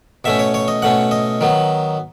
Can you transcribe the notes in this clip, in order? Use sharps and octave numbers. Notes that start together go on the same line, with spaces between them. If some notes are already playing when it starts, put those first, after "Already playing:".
B2 A3 C#4 E5
C#5
C#5
D#5
B2 A3 C#4 F#5
D#5
D#3 F#3 B3